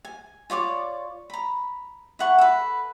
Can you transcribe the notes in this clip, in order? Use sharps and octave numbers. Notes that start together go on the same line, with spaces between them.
G#5
F4 C#5 D5 D6
A#5 B5
E4 F#5 C#6
A4 B4